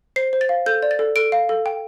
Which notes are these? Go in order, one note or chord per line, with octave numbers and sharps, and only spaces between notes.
C5 C7
C5
A6
F5
A4 G6
D5
A6
A4
A4 D7
F5
A4
G5